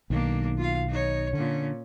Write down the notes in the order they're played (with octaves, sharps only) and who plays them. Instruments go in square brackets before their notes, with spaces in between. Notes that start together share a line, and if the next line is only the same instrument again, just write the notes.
[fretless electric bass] B1 D#3 [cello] A#3 D4
[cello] F4 F5
D#4 C#5
[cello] A#2 C#4 [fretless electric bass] D3